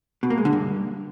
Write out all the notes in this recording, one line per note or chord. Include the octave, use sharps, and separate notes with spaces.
B2
A#3
G#3
D3
G2